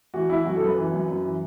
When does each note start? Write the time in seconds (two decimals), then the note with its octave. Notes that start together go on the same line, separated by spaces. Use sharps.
0.14 E3 F#4
0.29 E3 E4
0.45 F#2 F#4
0.56 A4
0.61 F#2 B4
0.77 E3
0.92 F#2
1.08 F#2
1.24 E3